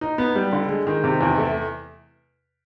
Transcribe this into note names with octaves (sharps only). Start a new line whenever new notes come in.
D#4
B3
G3
D3
G#3
D#3
C3
E2
A3